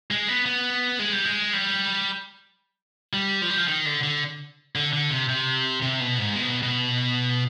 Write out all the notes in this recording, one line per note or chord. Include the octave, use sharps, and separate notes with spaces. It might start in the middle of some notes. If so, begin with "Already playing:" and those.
G#3
B3
B3
G#3
G3
G#3
G3
G3
F3
G3
F3
D#3
D3
D3
D3
D3
C3
C3
C3
B2
G#2
B2
B2